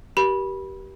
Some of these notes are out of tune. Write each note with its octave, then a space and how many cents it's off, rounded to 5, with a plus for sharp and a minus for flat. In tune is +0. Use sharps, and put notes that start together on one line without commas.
G4 -25 A#4 +45 B5 -15